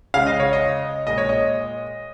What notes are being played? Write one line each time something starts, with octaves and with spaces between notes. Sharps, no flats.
C#3 G#3 F5
D#5
C#5
D#5
A#2 G#3 D#5
C#5
D#5